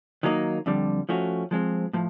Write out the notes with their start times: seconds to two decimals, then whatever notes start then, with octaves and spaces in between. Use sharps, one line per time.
0.23 D#3 F#3 A#3 D#4
0.66 F2 D3 G3
1.09 F3 A3 C#4 F#4
1.51 F3 G#3 C4
1.93 A2 F3